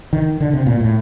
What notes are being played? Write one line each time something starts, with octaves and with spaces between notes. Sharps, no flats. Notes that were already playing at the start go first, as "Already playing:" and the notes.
D#3
D3
C3
A#2
A2